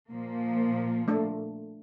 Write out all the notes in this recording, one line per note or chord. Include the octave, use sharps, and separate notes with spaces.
A#2 F3 A#3
A3 D4 A4